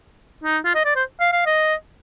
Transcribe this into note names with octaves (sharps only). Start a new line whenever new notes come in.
D#4
F4
D#5
D5
C5
F5
F5
D#5